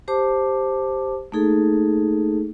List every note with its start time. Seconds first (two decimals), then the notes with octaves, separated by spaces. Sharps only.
0.08 G4 C5 A5 D6
1.32 A3 A#3 D#4 G#4 A4